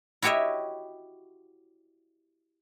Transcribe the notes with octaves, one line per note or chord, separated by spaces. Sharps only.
E4 F#4 G4 C#5 D#5 E5